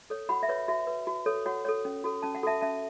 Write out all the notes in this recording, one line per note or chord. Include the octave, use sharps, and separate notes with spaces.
A4 C#5
F#4 F#5 B5
E5
B4 C#5
F#4 E5
B4
F#4
A4 C#5
F#4 C#5 F#5
A4 C#5
C#4
F#4 A4
C#4 A5
F#5
F#4 A4 E5 A5
C#4 E5 A5